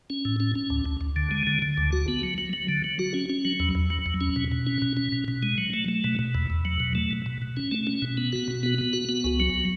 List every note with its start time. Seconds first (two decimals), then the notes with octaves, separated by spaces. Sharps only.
0.10 C#4
0.25 A2
0.40 C#4
0.55 C#4
0.70 D2
0.85 D2
1.01 D2
1.16 D3
1.31 G#3
1.47 D3
1.62 D3
1.77 D2
1.93 F#4
2.08 B3
2.23 F#3
2.38 F#3
2.53 F#3
2.69 D3
2.84 F#3
2.99 F#4
3.14 C#4
3.30 C#4
3.45 F#3
3.60 E2
3.75 E2
3.90 F#3
4.06 E2
4.21 C#4
4.36 B2
4.52 B2
4.67 C#4
4.82 B2
4.97 C#4
5.12 B2
5.28 B2
5.43 G#3
5.58 F#3
5.74 A3
5.88 A3
6.04 B2
6.19 B2
6.35 E2
6.50 E2
6.65 F#3
6.80 B2
6.95 A3
7.11 B2
7.26 B2
7.42 B2
7.57 C#4
7.71 A3
7.87 C#4
8.02 B2
8.17 B3
8.33 F#4
8.48 B2
8.63 B3
8.78 B3
8.93 F#4
9.09 B3
9.24 C#2
9.40 F#3